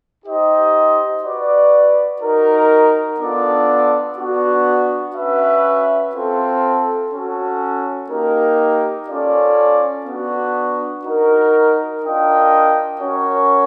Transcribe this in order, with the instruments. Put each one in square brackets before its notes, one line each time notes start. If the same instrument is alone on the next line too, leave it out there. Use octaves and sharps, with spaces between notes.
[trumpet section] D#4 G4 C5 D#5
F#4 B4 D5
D#4 F#4 A#4
B3 D4 F4 A4 D5
B3 D4 F#4
C#4 F#4 B4 E5
C4 F4 A4
C#4 F#4 A4
A#3 D#4 G4 A#4
C#4 F4 A4 D5
B3 D4 F#4
D#4 F#4 A#4
D4 F4 A#4 D#5 G5
C#4 F#4 A#4 C#5